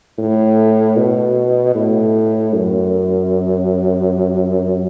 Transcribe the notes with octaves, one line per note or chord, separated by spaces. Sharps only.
A2
B2
A2
F#2